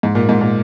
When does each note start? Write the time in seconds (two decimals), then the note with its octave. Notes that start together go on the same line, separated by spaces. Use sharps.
0.03 G#2
0.15 A#2
0.29 G#2
0.41 A#2